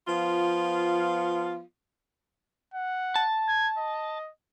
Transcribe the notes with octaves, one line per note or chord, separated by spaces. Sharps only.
F3 B3 F4
F#5
A5
G#6
D#5